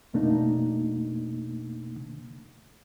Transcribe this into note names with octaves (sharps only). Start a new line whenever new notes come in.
F2 B2 A3 A#3 D4 D#4